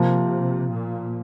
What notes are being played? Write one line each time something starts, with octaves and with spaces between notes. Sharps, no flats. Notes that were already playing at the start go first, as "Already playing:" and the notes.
Already playing: C3 F3 A#3 F4
A#2